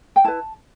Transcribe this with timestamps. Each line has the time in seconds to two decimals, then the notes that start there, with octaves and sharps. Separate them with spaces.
0.16 G5
0.24 E4 B4 A5